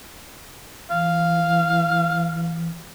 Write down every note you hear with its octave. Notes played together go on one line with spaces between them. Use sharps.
E3 F5